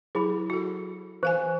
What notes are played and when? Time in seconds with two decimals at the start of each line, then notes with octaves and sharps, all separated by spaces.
0.15 F#3 E4 G#4 B5
0.50 F#4 A4
1.23 E3 C5 F5 G#5